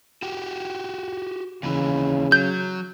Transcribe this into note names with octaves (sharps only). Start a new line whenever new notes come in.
F#4 G4
D#2 C#3 E3
F#3 G6